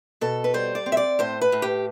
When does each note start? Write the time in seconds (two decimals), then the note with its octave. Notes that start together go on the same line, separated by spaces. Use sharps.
0.21 B2 A4
0.44 B4
0.54 G3 C5
0.75 D5
0.86 C4
0.92 E5
0.97 D5
1.19 A2 C5
1.41 B4
1.52 A2
1.62 G4